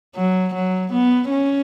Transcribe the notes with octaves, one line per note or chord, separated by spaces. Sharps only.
F#3
F#3
B3
C#4